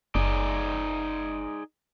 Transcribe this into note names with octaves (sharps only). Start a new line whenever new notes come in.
F#1 D#4 G#4 D5